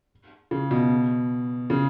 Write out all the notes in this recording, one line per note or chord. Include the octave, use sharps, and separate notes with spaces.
C#3
B2
C#3